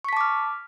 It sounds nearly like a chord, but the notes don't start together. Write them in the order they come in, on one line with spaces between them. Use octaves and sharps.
C#6 B6 A5 D6 F6